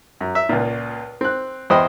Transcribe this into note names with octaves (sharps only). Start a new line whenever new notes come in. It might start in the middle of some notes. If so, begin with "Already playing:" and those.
F#2
E5
C#2 A#2
C4 F#6
E2 C5 D#5 G5 B5 D#6